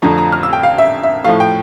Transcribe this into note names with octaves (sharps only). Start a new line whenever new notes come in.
F2 D3 F3 A3 A#5
A#5
F6
E6
G5
F5
E5
E5
A2 F3 A3 F5
G5